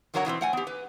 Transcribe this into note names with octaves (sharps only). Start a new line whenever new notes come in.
F2 D3 F#3 A#4 C#5 F#5
B2 E3 A#3 C4
A3 F#5 G#5
B3 G4
B4